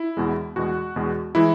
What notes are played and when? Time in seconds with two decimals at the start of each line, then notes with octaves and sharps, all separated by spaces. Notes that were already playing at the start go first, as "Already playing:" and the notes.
Already playing: E4
0.17 E2 B2 G#3
0.56 E2 B2 G#3 F#4
0.96 E2 B2 G#3
1.35 E3 G#3 E4